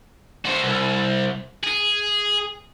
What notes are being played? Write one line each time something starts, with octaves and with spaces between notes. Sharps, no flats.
F#4 C5
C2
G#4